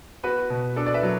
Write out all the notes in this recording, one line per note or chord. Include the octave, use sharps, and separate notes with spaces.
B3 F#4 B4
B2
D4 A4
D5
B4 E5
F#3